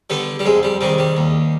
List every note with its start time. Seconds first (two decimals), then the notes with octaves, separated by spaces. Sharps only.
0.10 D3 G3 B3
0.39 G3
0.45 F2 G#3
0.63 G3
0.81 C3 D#3 G3
0.98 G3
1.17 D#2